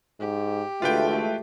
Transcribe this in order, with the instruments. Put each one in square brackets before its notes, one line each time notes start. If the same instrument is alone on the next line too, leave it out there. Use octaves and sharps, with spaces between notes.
[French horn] G#2 [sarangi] G4
[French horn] D2 [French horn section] E3 G#3 A3 [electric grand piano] F4 B4 G5